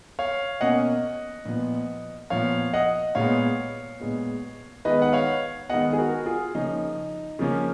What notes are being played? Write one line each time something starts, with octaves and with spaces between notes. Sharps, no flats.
C#5 F5
B2 A#3 C#4 D#5 F#5
A#2 F3 B3
A#2 F3 B3 C#5 F5
D#5 F#5
A#2 G#3 B3 C#5 F5
A#2 G#3 B3
D#3 G#3 B3 B4 D#5
F#5
C#5 F5
D#3 G#3 B3 D#5 F#5
G#4
F#4 A#4
F4 G#4
C#3 F3 A#3 C#4 D#4
C#3 F3 A#3 C#4